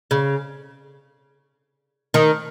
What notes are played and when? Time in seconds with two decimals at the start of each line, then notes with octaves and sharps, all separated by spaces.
0.11 C#3
2.14 D#3